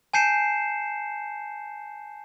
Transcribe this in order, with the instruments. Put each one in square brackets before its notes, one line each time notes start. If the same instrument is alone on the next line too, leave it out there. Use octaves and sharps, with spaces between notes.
[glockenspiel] G#5 A5 G6 C7 C#7 E7